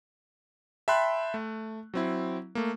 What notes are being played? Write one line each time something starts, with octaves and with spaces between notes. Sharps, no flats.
E5 G5 A5 B5 C6 F#6
A3
F#3 C4 E4
A3 A#3